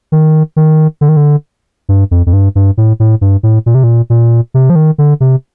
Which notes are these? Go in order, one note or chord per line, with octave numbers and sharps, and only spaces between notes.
D#3
D#3
D3
D#3
D3
G2
F2
F2
G2
G2
A2
A2
G2
A2
A#2
C3
A#2
A#2
C3
F3
D#3
D3
C3